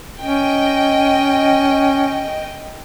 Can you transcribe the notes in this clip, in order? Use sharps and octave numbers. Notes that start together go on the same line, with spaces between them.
C#4 D#5 G5